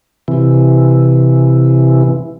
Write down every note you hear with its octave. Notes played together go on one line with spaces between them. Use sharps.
C3 E3